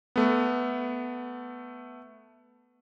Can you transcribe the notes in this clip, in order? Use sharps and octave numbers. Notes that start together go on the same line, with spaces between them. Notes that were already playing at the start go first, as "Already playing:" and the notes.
A3 B3